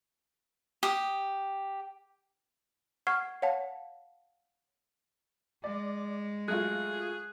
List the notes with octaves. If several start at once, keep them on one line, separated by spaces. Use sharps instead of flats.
G4 D#6
F#5 C#6 F6 G#6 C7
C#5 F5 F#5 A5
G#3 D5
F#3 A3 F4 G#4 F#6